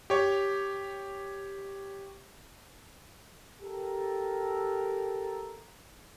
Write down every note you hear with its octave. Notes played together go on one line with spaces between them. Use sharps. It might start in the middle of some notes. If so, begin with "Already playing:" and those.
G4 C#5
G4 A4 A#4